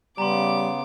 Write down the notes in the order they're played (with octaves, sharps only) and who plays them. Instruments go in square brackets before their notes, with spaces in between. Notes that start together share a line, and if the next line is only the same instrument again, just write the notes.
[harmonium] C#3 B3 [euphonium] G3 [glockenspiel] A#5 C6 [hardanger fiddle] D6